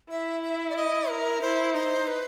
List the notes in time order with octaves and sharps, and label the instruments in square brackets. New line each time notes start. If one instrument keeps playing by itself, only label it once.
[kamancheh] E4 [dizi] E5
[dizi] E5
D5
D#5
A#4
[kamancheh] E4 [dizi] C5
[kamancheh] D#4 [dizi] C5
[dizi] B4